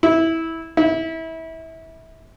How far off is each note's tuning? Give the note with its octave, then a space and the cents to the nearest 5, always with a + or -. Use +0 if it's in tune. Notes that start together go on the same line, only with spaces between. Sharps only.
E4 -15
E4 -25